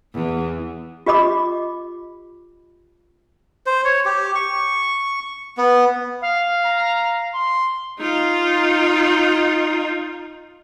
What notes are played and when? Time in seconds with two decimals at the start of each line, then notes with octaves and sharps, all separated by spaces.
0.14 E2
1.06 F4 G4 D#5 B5 D6
3.66 C5
3.84 C#5
4.06 G4
4.35 C#6
5.57 B3
6.21 F5
6.65 A#5
7.34 C6
7.99 D#4 F4